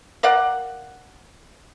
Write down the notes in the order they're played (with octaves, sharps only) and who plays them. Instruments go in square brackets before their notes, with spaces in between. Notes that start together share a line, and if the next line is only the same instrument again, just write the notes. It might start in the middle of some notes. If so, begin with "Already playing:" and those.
[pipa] A#4 D5 F5 F#5